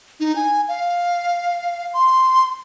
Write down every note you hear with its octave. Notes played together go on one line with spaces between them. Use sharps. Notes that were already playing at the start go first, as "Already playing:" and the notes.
D#4
G#5
F5
C6